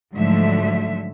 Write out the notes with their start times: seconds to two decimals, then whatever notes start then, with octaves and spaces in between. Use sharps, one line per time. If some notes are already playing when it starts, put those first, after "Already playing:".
0.14 G#2 D3 F3 F#3 A3 E5